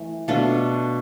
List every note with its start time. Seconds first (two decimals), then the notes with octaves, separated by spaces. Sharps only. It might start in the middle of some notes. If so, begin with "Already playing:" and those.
Already playing: E3 A3
0.28 B2 A3 D4 F4